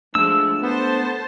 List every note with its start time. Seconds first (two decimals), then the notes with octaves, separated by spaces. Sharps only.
0.15 F3 G#3 A3 D4 E6
0.62 B3 A4 C5 A5